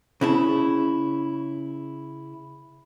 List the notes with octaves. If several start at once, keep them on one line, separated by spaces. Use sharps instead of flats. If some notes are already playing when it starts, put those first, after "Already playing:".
C#3 E4 A5